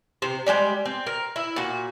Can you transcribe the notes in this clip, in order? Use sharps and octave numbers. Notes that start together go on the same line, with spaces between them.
C3 C5
G3 G#3 G4 D5
C4
A#4
E4
A#2 F#4